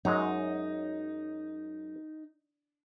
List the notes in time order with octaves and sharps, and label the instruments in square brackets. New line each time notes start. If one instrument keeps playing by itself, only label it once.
[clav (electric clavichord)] F#2 F#3 G#3 [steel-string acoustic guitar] D#4